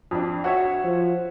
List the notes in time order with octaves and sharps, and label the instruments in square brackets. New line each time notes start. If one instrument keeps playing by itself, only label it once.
[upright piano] F2 D4
F#4 C#5 E5
[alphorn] F3